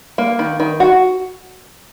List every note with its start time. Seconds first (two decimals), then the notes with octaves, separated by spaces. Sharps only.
0.18 A#3
0.39 D#3
0.60 D#3
0.80 F#4